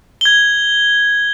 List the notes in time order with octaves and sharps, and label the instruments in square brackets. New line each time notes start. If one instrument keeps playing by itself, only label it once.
[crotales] G#6 G7